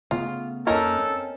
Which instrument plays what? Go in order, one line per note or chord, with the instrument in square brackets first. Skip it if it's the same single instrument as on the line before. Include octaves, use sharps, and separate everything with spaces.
[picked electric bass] C#3 A3 B3 [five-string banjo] F4
[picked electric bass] F2 A#3 [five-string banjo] C#4 D#4 A#4 [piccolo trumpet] A4
[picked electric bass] C4